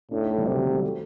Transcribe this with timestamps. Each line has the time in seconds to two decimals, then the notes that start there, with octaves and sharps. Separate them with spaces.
0.11 A2 D4
0.20 D#4
0.30 A3
0.38 G3
0.47 C3 F#3
0.57 D#3
0.65 F#3
0.75 G3
0.83 A3